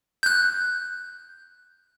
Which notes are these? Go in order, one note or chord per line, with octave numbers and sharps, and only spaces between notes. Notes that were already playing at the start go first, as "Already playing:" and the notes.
F#6 G6